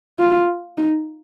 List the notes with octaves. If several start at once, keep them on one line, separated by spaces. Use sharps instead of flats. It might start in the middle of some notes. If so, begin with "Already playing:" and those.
F4
D#4